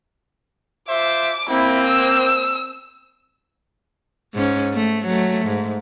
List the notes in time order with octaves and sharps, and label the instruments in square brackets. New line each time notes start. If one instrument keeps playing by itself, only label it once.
[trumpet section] F4 C5 E5 [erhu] D6
[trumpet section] A#3 [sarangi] C4 [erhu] E4
[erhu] E6
[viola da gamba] G#2 C#4
A3
F#3 A3
G#2